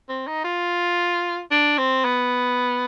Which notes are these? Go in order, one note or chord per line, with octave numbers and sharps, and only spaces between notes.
C4
D#4
F4
D4
C4
B3